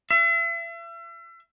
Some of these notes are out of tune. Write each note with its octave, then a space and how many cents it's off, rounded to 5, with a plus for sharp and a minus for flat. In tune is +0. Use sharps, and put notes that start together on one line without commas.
E5 +40